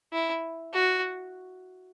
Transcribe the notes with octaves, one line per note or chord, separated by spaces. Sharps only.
E4
F#4